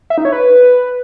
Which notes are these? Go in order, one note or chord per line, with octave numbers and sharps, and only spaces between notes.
E5
D#4
C#5
B4